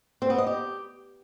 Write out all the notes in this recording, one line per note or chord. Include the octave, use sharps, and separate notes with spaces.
C4
B3
D#5
G4